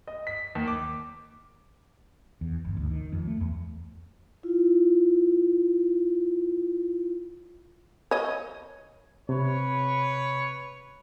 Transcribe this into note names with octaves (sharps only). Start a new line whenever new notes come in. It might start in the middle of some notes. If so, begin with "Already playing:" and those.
D#5
B6
D#2
D6
E2
G1
D2
D#3
F2
A3
E2
E4 F4
C#5 D#5
C3 B4 C#5